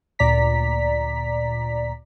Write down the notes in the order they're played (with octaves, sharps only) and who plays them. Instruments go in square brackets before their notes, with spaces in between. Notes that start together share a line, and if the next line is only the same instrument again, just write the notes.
[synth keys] D2 A#2 D5 A#5 B6